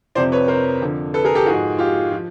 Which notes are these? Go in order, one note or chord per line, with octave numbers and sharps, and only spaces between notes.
F2 C3 F3 C5 D5
B4 C#5
A#4 C5
F2 D3 F3
A4 B4
G#4 A#4
G4 A4
G#2 F3 F#4 G#4
F4 G4
F3